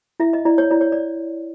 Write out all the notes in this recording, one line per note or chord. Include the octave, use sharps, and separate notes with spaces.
E4 E5
D#5
E4 D5
C#5
E4 D5
C#5
D5